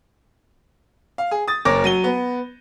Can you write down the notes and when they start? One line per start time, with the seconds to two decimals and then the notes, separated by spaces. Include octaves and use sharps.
1.18 F5
1.31 G#4
1.48 D#6 A6
1.65 F#1 A#4 C#5 D6 A#6
1.84 F#3 D#7 G7
2.04 B3